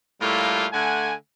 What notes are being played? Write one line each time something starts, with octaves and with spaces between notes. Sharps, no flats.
A2 G3 A3 A#3 F4
D3 A3 F#5 G#5